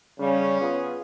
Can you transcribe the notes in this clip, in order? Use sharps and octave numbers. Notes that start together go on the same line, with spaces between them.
C#3 G3 C#4
B3 F4 G#4